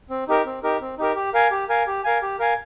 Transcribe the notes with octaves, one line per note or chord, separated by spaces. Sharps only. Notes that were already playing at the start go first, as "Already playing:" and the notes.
C4
D#4 G4 A#4
C4
D#4 G4 A#4
C4
D#4 G4 A#4
G4
A#4 F5 G#5
G4
A#4 F5 G#5
G4
A#4 F5 G#5
G4
A#4 F5 G#5